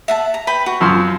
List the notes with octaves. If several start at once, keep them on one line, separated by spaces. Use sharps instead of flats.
E5 F#5 A5
A#5
B4 G5 B5
F#4
F#2 F3 C6